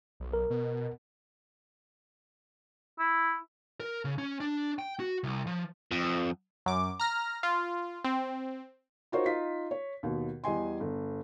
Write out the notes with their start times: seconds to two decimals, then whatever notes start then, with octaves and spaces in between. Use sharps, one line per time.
0.20 B1
0.33 A#4
0.50 B2
2.99 E4
3.80 A#4
4.05 C#3
4.18 C#4
4.40 D4
4.79 G5
5.00 F#4
5.23 C2
5.47 F3
5.91 F2
6.66 F#2 D6
7.00 A#5 F6 A#6
7.43 F4
8.05 C4
9.12 D#4 F4 F#4 A#4 C5 C#5
9.25 D#4 F4 B6
9.71 C#5
10.03 D#2 B2
10.44 E2 G3 D#5 G#5 C6
10.80 G1